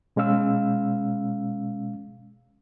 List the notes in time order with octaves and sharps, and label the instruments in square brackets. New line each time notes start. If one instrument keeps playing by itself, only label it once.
[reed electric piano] B2 G#3 C#4 F5 E6